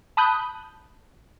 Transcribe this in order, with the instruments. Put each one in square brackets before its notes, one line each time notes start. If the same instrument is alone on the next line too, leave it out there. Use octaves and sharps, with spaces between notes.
[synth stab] A5 B5 D#6 F#6 G6